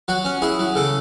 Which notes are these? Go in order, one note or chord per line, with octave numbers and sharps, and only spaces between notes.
F#3 F#4
C#4
E4 G#4
F#3
C#3 A4